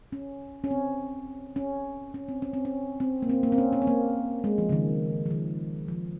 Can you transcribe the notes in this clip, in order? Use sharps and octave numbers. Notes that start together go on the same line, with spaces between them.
C#4
C#4
C4
C#4
C#4
C4
C#4
C4
C#4
C4
A#3
C4
A#3
C4
C#4
C#4
C4
A#3
G#3
F3
C#3
D#3
F3
D#3
F3